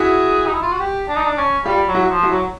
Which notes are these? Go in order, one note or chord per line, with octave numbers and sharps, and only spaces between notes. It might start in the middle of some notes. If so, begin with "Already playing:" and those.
Already playing: E4 F#4 G#4
D#4
E4
F4
F#4
G4
D4
D#4
D4
C#4
G3 F4 G4
F#3
E4 F#4
F3
E4 F#4
F#3